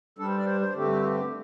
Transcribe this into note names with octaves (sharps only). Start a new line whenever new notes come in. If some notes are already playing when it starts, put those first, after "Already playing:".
G2 G3 D4 A4
C5
D5
C5
C5
G2 D3 A3 C4 G4